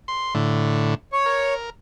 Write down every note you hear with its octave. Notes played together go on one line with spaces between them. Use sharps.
C6
A2 D3
C#5
A#4